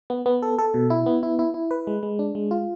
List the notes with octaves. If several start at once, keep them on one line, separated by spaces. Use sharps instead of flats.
B3
B3
A4
A4
B2
E4
B3
E4
E4
E4
B4
G#3
G#3
D4
G#3
F4